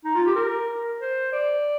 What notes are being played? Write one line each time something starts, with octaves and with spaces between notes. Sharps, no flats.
D#4
F4
G4
A#4
C5
D5